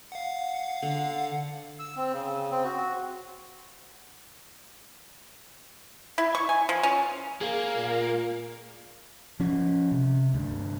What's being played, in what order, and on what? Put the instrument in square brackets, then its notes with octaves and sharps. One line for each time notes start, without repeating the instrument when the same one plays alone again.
[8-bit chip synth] F5 F#5
[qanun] D3
[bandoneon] E6
C4
C#3
C4
F#4
[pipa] E4
C#6
G#5
F3
C#4
[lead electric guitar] A#3 [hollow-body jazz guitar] G#4 [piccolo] F5
[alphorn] A#2
[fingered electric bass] F3 C#4
C3
D2 G2